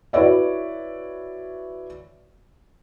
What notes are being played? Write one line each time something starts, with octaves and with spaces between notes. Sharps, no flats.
E4 F#4 B4 C#5 D5 E5